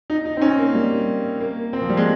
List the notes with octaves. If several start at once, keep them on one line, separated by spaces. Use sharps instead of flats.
D#4
D#4
C4
C#4
A#3
G3
A#3
C4
F3
G3
G#3